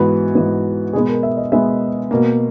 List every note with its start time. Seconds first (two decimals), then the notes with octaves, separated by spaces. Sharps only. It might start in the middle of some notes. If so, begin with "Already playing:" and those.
Already playing: G#2 E3 B3 F#4
0.35 G#2 E3 B3
0.93 B2 G#3 B3 G#4
1.08 A#4
1.23 E5
1.37 D#5
1.52 B2 G#3 B3 E5
2.11 B2 A#3